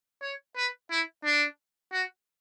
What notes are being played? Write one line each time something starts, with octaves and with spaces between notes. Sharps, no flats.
C#5
B4
E4
D4
F#4